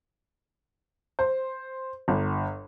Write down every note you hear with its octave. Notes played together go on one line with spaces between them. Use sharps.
C5
G1